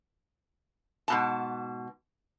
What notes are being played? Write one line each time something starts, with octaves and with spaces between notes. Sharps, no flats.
G#2 B2 A5